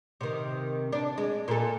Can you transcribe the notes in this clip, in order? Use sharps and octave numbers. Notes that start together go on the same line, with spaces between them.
C3 D#3
D4
G#3
A#2 A4